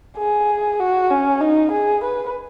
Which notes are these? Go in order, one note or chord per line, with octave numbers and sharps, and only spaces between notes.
G#4
F#4
C#4
D#4
G#4
B4